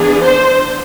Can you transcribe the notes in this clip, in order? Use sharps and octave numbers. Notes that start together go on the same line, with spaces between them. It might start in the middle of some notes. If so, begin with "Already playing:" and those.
Already playing: E3 B3 D4 G#4
C5